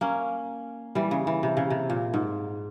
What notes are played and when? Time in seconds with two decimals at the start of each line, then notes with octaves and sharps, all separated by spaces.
0.01 A#3 C#4
0.95 E3 G3
1.11 C#3
1.27 E3
1.43 C3
1.57 C#3
1.70 C3
1.90 A#2
2.14 G#2